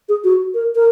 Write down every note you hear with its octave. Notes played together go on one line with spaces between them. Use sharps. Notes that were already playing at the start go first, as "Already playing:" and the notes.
G#4
F#4
A#4
A#4